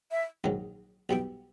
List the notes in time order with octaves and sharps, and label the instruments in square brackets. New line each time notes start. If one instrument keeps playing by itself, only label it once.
[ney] E5
[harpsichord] A#1 G#2 D#3 F#3
[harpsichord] B1 B2 G3 B3 E4 [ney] G5